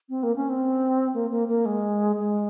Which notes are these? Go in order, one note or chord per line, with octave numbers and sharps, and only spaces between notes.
C4
A#3
C#4
C4
A#3
A#3
A#3
G#3
G#3